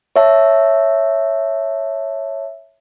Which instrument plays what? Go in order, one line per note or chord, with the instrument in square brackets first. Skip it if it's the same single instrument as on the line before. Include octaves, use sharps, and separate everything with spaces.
[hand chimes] C#5 E5 A5